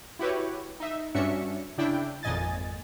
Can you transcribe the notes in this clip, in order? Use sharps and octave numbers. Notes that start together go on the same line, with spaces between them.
E4 F#4 G4 B4 C#5
D#4 E5
G2 C#4 D4 F#4 E5 C#7
C#3 D4 E4 G5
G#1 F2 A#2 D#5 G#5 A6